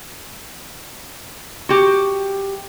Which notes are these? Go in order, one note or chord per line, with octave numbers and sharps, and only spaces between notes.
F#4 G4